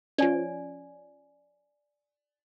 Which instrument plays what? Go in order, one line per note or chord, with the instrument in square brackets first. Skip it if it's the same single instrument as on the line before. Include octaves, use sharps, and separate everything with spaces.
[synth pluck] F3 C#4 [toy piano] D5 G#5